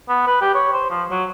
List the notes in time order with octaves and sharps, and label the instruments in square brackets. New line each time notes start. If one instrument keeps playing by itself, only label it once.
[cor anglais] B3
B4
G4
C#5
C5
F3
F#3